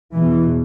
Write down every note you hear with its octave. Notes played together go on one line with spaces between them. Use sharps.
E2 B2 E3